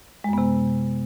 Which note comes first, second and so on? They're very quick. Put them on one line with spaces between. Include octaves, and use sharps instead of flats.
G#3 F#2 B3 C3